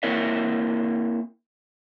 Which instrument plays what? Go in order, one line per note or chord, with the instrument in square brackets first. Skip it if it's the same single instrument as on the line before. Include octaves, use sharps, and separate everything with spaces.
[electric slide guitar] A#3 C4 E4 A#4 C#5 E5